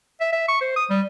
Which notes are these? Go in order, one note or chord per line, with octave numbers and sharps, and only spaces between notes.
E5
E5
C#6
C5
D#6
G3